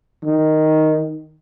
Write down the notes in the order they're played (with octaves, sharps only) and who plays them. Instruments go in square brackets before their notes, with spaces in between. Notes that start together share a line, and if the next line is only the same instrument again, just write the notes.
[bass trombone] D#3